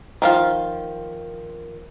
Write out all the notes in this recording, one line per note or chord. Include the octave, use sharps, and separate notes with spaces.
D#3 F3 F4